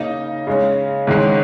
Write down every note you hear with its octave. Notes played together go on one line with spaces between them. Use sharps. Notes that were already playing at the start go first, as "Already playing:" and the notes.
Already playing: C#3 A#3 D#4 D#5
C#3 G#3 C#4
G#2 D#3 G#3 C#4